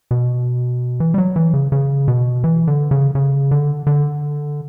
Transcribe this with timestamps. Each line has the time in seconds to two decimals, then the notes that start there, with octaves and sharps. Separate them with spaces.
0.11 B2
1.00 E3
1.14 G3
1.18 F#3
1.36 E3
1.54 C#3
1.72 C#3
2.08 B2
2.44 E3
2.67 D3
2.91 C#3
3.15 C#3
3.51 D3
3.87 D3